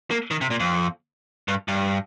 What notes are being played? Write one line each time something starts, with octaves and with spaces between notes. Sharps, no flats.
A#3
D#3
C3
A#2
F2
G2
G2